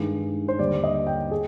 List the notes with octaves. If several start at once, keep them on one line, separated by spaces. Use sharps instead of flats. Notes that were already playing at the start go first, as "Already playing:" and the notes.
Already playing: G2 D#3 G#3
C5
D#2 D3 G3 D5
D#5
G5
G#4